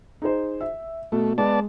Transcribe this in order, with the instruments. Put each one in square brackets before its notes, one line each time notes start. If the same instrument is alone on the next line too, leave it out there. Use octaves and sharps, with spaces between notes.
[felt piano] D#4 G#4 C5
E5
[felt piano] B2 [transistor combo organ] A3
[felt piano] G#3 [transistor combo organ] B3 D5 A5